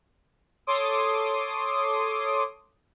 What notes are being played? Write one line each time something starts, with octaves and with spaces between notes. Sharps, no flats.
A4 C#5 C6 D6 D#6